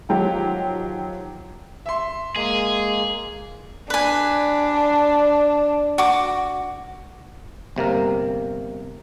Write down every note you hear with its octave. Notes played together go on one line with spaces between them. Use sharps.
D#3 F3 F#3 G4
E5 C6
G#3 A#3 G#4
D4 B4 G#5
F#4 D6
G1 C3 A#3 A#4